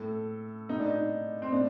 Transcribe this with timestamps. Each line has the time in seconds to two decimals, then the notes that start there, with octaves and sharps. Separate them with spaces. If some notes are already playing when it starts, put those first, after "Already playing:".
Already playing: A2 A4
0.69 A2 D#4
0.80 D4
0.90 D#4
1.42 C4
1.52 A2 D4